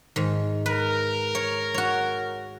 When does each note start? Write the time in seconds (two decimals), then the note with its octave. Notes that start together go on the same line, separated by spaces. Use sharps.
0.16 G#2 D#3
0.66 A#4 B4
1.35 C#5
1.74 F#4 C#5